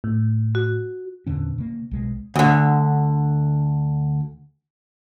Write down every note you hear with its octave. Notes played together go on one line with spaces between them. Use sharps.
A2
F#4
E2 A#2 D3 C#4
C#3 A#3
B1 G#3
D2 D3